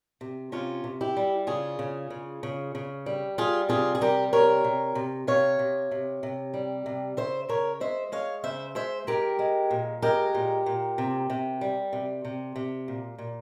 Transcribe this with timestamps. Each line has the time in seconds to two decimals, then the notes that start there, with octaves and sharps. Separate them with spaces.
0.21 C3
0.52 C3 C#4 F4
0.84 C3
1.01 E4 G4
1.17 G3
1.47 C#3 F4 G#4
1.79 C#3
2.10 C#3
2.43 C#3
2.75 C#3
3.06 G3
3.38 G3 F4 G#4
3.69 C3 F4 G#4
3.95 G#4
4.01 G3 G4 A#4
4.33 C3 A#4 C#5
4.64 C3
4.95 C3
5.27 C3 C#5 F5
5.59 C3
5.91 C3
6.23 C3
6.54 G3
6.86 C3
7.17 C#3 C5 E5
7.49 C#3 A#4 C#5
7.80 G#3 C5 E5
8.12 G#3 C#5 F5
8.44 C#3 C5 E5
8.75 G#3 C5 E5
9.07 G#3 G4 A#4
9.39 G#3
9.71 A#2
10.02 G#3 G4 A#4
10.35 A#2
10.66 A#2
10.98 C3
11.30 C3
11.61 G3
11.93 C3
12.25 C3
12.56 C3
12.88 A#2
13.18 A#2